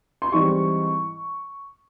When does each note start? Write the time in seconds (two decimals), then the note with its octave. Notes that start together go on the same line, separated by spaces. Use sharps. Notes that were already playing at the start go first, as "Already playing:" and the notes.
0.22 C6
0.32 G#2 E3 G3 C4 C#6